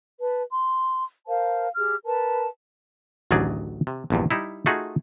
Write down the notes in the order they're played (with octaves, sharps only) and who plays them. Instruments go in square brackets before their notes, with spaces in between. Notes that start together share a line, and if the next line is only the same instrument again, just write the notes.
[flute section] B4 A5
C6
A#4 C5 F5 A5
G4 G#4 F6
A#4 B4 A5
[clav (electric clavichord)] A1 D2 D#3 F#3 G#4 D5
C3
A#1 E2 G2
G3 D#4 E4
A3 D#4 F4 F#4 G#4